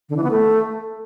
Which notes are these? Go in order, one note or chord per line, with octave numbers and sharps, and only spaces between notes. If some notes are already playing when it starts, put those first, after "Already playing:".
D3
E3
B3
A3